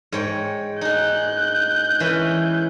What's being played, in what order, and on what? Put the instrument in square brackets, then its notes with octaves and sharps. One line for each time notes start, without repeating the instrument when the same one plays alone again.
[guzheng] G#2 C#5 G5
[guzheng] D#4 G#4 [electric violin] F#6 G6
[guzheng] E3 C#4 B4